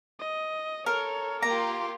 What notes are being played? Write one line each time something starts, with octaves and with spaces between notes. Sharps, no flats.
D#5
A4 A#4 C#5
A#3 F4 G4 A#5 C6 D6